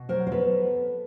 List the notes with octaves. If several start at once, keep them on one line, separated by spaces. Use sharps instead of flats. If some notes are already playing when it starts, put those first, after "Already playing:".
Already playing: B2
F#3 A#4 C5
C5
B3 A4 B4